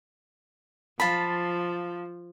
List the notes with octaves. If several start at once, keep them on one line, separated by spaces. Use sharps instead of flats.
F3 F4 A5 B5